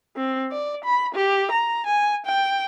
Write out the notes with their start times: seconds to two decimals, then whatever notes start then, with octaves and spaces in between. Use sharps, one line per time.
0.16 C4
0.51 D5
0.85 B5
1.15 G4
1.51 A#5
1.87 G#5
2.26 G5